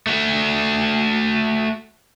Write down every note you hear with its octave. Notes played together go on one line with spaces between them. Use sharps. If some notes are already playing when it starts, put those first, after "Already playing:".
A3 F#4